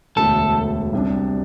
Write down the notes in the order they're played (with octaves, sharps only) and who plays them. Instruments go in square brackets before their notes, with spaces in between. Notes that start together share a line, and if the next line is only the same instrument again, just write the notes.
[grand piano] E1 D2 D3 A3 E4 [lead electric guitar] A4
[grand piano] C2 C3 G3 D4